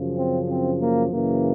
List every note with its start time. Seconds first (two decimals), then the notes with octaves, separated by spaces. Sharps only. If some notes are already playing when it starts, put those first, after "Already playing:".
Already playing: F#2 C#3 F3
0.17 C4
0.49 C4
0.80 A#3
1.12 F#2 C#3 E3 A#3